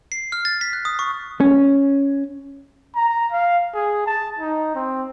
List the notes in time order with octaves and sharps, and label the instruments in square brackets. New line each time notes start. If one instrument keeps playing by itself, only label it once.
[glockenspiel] C7
F6
A6
B6
F#6
D#6
C#6
[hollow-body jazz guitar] C#4
[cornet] A#5
F5
G#4
A5
D#4
C4